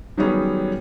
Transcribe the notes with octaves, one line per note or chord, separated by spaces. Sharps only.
D#3 F#3 G3 B3 C#4 G#4